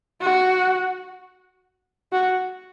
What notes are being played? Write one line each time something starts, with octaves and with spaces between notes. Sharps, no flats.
F#4
F#4